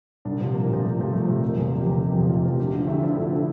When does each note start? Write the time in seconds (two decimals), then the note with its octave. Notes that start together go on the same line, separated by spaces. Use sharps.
0.25 C2 D4
0.41 C3 F3
0.54 C2 A#3
0.69 C3 F3
0.83 C2 A3
0.98 C3 F3
1.13 C2 A3
1.27 C3 F3
1.42 F1 A#3
1.57 E2 C3 F3
1.71 F1 A#3
1.81 G4
1.86 E2 C3 F3
2.00 F1
2.14 E2 C3 F3
2.30 F1 F4
2.45 E2 C3 F3
2.59 D2 G4
2.73 D3
2.78 F3
2.87 D2 E4
3.03 D3 F3 D4
3.17 D2 A3
3.32 D3 F3